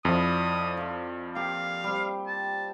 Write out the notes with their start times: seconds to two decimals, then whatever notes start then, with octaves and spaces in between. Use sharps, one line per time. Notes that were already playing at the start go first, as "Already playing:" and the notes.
0.05 F2 F3 E4 D5 D#6
0.77 F4 C6 D6
1.35 A#3 G4 F5
1.84 G3 C4
2.27 A5